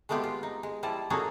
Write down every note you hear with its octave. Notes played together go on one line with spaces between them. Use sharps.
G#3 A3 B3 F4 G4
F4
D#4
G#3
F3 G3 E4 A5
A#3 C#4 D#4 F#4 G#4 A4